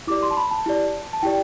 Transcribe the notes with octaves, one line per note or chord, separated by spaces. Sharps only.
E4 G4 D5 D6
C6
A5
B5
A5
E4 G4 D5
A5
E4 G4 D5 G5